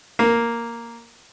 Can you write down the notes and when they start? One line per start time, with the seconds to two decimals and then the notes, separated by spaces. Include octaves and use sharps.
0.19 A#3